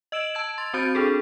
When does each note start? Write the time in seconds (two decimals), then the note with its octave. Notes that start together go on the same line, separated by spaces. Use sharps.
0.12 D#5 E6 D7 E7 F#7
0.35 A5 E6 G#6
0.58 C6 A6
0.74 C4 F#4 C5 G6 A6 D7
0.95 D4 G#4 A4